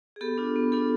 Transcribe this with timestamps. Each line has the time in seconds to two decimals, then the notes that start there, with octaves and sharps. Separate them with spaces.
0.16 G#4
0.21 B3 G4 A4
0.38 D4 F4
0.56 B3
0.72 D4 F4 G4 A4